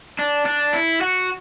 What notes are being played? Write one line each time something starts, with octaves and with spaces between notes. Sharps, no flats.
D4
D4
E4
F#4